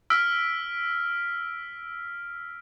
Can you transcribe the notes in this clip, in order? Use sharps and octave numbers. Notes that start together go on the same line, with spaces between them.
E6 F6 B6 D7